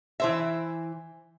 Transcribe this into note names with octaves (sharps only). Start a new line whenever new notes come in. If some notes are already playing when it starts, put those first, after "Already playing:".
E3 C5 E5